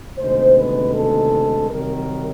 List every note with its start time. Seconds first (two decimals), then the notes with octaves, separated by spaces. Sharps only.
0.17 D2 C3 D#3 G#3 B3 C5
0.55 B4
0.93 A4
1.69 C2 C3 D#3 F#3 A#4